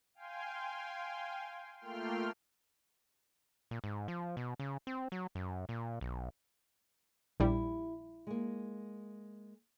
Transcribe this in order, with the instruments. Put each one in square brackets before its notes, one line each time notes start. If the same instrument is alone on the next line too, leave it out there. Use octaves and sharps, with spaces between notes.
[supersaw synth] F5 G5 G#5 C6
A3 A#3 F4 G5 C6 F6
[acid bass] A#2
G#2
F3
B2
C#3
C4
F#3
F#2
A#2
B1
[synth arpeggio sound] A#1 G3 [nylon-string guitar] E4
[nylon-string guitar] G#3 A#3